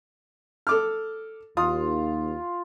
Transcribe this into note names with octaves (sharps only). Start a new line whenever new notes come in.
A4 D6 F6
D#2 F4 D#6